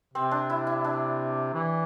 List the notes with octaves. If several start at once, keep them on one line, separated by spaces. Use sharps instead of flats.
C3 C4
D4
E4
E4
D4
E3